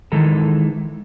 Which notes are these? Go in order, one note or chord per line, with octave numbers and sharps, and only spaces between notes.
D#3 E3 G#3 D#4 A4 A#5